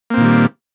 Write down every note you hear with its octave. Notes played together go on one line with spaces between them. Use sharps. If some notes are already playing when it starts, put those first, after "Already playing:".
A#2 D#3 G3 A#3 C4